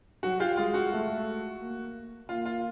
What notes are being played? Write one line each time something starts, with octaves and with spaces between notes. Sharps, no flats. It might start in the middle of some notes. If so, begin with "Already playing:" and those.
F#3 F#4
F4 G4
G#3 F4
F#4
A3
A#3
A#3 F4
F4